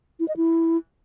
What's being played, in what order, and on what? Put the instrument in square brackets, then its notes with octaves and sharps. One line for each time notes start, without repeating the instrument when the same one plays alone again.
[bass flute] E4
D#5
E4